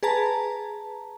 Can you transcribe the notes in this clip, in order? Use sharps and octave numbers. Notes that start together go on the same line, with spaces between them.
G#4 B4 A5 A#5